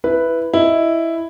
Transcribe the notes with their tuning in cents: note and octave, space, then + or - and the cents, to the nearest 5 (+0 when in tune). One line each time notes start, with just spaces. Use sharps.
E4 +0 B4 +0
E4 +0 D#5 +0